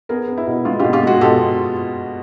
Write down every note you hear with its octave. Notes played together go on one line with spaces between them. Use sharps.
B3 G#4 A#4
B3
E4
B2
G#3 F4
F4 G4
B2
F4 G4
G#3 F#4 G#4
B2 G4 A4